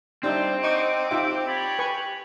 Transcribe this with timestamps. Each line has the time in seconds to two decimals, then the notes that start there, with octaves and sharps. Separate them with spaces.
0.23 G3 C4 D4 D#4 E5
0.64 D#4 F#5 C#6 D6
1.11 D#4 F4 G4 E5
1.47 C#5 D5 B5
1.79 B4 G#5 C#6